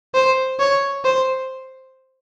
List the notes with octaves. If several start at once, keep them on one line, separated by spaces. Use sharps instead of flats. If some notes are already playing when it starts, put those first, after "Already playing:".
C5
C#5
C5